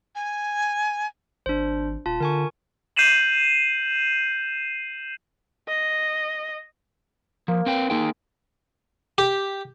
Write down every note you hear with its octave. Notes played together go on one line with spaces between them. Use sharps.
G#5
G#1 D4 C5
D#1 F4 A5
D3 A#4 G#5 C#6
G6 C7 D#7 E7 F#7
D#5
F3 A#3
C4 B4 G5
G#3 A#3 D#4 G5
G4